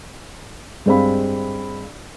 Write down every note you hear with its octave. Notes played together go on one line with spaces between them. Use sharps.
G2 G#3 C4 F5 B5